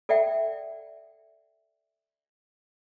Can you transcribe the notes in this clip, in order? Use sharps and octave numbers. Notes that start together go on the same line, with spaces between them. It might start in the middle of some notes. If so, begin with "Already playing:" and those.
A4 D5 E5 F#5 G5